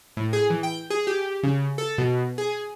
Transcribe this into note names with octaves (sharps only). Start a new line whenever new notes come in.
A2
G#4
E3
G5
G#4
G4
C#3
A4
B2
G#4